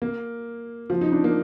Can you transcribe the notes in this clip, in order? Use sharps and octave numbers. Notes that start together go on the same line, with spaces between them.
A#3
F3
D#4
D4
A#3